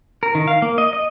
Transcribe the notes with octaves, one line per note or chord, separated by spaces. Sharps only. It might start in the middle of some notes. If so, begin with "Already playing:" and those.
A#4
D#3
F5
A#3
D#5
D#5